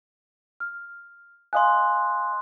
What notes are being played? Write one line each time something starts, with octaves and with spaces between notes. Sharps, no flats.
F6
D#5 F5 G#5 C6 D#6 F#6